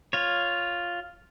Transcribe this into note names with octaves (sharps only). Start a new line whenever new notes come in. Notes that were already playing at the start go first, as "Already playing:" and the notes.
F4 C#5